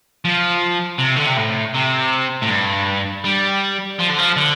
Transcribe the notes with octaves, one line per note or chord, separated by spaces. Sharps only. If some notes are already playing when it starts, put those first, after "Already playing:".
F3
C3
D3
C3
A2
C3
A2
G2
G3
F3
D3
F3
D3